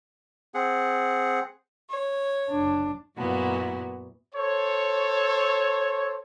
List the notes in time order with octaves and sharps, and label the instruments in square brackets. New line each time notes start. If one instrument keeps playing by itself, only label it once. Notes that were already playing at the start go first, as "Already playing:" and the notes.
[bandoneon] C4 G#4 F#5
[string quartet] C#5
[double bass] F#1 D4
[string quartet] F#2 A#2 B3 E4 F#4
[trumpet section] A4 C5 C#5